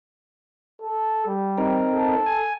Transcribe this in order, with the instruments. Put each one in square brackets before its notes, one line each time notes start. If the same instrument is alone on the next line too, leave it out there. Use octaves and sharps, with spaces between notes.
[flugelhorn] A4
G3
[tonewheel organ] C4 D#4 A#4
[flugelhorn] A4
[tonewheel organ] G#5